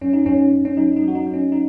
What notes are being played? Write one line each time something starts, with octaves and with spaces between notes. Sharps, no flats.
F#2 C#4
D#4
F#2 C#4
F#2
C#4
F#3 D#4
D#4
F#3
F#4
D#4
F#3
C#4
D#4